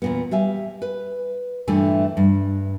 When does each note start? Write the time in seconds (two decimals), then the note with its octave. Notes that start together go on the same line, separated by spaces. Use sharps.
0.02 E2 A#2 B3
0.31 G3 E5 F5 G#5
0.82 B4
1.67 G2 A#2 E3 A3 E4 G#5
2.17 G2